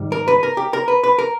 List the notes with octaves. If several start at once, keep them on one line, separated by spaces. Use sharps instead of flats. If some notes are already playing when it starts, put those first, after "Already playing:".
Already playing: G#2 D#3 G3
A#4
B4
A#4
G4
A#4
B4
B4
A#4